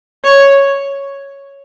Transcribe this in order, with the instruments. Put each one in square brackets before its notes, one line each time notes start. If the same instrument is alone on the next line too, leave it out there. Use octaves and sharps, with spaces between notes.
[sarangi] C#5